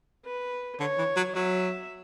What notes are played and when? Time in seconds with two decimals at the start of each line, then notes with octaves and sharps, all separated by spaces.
0.25 B4
0.80 D3 C#5
0.98 E3
1.16 F#3
1.35 F#3 E5